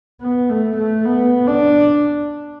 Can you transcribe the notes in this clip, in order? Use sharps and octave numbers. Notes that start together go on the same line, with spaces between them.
B3
A3
A3
B3
D4